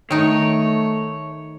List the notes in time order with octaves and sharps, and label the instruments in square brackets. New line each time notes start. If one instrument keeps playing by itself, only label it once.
[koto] D#3 D#4 [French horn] A3 [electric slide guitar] C#5